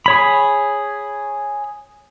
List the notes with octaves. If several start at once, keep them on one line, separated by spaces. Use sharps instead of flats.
G#4 C#5 B5